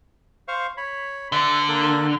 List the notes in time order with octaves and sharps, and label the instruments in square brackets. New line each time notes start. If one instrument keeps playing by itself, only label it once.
[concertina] C5 F5 C#6
C#5 B5
[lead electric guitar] D3 [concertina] B4 D5 E5
[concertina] A#3 A4 F#6